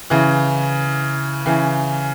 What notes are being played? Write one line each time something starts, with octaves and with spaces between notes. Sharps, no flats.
C#3 E3
C#3 E3